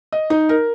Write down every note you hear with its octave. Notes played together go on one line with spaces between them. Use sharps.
D#5
D#4
A#4